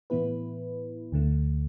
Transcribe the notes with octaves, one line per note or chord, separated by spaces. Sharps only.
A2 E3 B3 E4 B4
D2 D3 A3